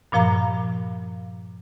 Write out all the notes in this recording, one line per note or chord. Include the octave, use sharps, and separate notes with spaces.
G2 A#2 F3 F5 A#5